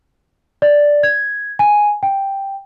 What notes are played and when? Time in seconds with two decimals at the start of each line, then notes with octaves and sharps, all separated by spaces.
0.62 D5
1.03 G#6
1.59 G#5
2.03 G5